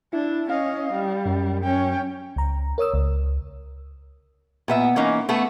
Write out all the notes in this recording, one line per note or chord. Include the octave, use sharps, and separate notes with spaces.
D4 E4
C#4 D#5 F5
G3
F#2
C#4 G5
C#2 A#5
A#4 C#5 D#6 E6
C#2
A#2 B3 E5
E3 A#3 C#4 D#4
A3 B3 A4